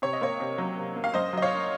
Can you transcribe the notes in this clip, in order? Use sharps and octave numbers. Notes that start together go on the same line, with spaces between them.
C3 C#5
D#5
A#3 C#5
C3
F#3
C3
A#3
F5
F#2 C5 D#5
F#3 D#5
C#5 F5